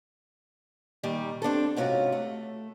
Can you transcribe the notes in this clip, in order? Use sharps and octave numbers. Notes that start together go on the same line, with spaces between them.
A#2 D#3 G3 G4
C4 D4 G4 A4
G#2 C3 C#4 F4 F#4
A3